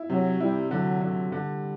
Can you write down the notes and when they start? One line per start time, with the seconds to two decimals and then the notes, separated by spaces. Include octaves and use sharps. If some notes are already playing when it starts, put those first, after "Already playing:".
Already playing: E4
0.10 C3 F#3
0.40 G3 E4
0.71 D3 F#3
1.01 D3
1.32 D3 G3